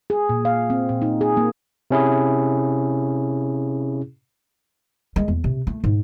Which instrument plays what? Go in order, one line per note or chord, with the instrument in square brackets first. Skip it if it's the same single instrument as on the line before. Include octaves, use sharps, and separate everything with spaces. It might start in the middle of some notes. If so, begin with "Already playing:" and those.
[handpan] G#4
A#2
F5
C4
A#2
D#4
G#4
A#3
[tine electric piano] C3 C#4 E4 G#4
[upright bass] G#3
E2
C3
A3
G#2